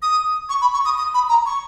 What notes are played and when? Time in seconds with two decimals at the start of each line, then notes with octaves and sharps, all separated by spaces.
0.02 D#6
0.49 C#6
0.61 B5
0.74 C#6
0.85 D#6
0.98 D#6
1.14 B5
1.29 A#5
1.46 C#6